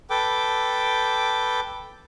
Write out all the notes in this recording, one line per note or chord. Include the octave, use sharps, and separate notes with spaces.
A4 B4 G5 D6